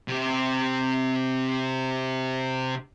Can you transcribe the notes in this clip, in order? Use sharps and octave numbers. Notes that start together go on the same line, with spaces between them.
C3 G4